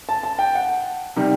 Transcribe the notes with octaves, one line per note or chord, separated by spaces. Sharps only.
A5
A5
G5
F#5
C3 D#3 G3